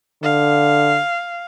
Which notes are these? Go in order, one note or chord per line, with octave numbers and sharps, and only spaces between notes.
D3 F5